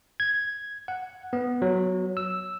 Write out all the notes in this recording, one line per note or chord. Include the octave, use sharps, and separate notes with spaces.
G#6
F#5
B3
F#3
E6